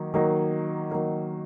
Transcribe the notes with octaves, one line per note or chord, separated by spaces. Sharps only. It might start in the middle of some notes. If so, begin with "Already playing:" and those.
Already playing: D#3 F#3 A#3 D#4
D#3 F#3 A#3 D#4
D#3 F#3 A#3 D#4